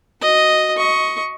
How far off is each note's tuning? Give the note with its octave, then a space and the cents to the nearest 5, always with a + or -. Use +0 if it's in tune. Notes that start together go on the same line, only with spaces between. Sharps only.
F#4 +0 D#5 +0
D#5 +20 C#6 +0